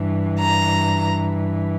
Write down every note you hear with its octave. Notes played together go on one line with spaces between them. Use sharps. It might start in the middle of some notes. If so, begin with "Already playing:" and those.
Already playing: G2 E3
A#5